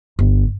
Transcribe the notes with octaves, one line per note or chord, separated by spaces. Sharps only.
G1